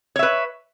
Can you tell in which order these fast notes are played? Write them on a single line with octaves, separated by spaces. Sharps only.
C#5 E5 B4